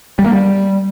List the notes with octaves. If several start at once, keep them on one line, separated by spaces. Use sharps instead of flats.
G3
A#3
G3